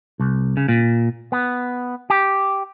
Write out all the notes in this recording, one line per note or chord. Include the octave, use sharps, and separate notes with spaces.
C2
C#3
A#2
B3
G4